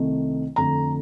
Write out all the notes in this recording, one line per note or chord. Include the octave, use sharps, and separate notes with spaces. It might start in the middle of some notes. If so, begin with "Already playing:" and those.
Already playing: C2 C3 D#3 A3
F2 D3 A3 A#5